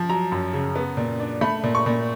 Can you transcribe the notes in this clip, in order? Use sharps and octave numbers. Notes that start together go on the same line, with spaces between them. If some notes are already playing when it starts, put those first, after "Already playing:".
Already playing: F3
F#3 A#5
F#2
C#3
B3
A#2
D4
A3 B5
A#2
C#6
A#2